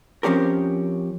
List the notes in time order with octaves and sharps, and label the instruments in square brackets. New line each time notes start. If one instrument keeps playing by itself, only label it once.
[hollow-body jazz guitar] F3 C4 C#4 G4 A#4